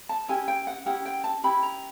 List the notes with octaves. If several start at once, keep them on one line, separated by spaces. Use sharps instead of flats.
A5
C#4 E4 G4 G#5
G5
F#5
C#4 E4 G4 F#5
G5
A5
C#4 E4 G4 B5
A#5